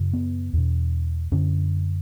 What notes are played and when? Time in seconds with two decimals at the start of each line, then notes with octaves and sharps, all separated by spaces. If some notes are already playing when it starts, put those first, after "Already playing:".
Already playing: F#2 C#3
0.13 B3
0.53 E2 B2
1.32 F#2 D3 C#4